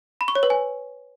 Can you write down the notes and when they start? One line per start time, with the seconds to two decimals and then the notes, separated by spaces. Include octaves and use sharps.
0.21 B5
0.28 C#6
0.35 C#5
0.43 B4
0.50 G#5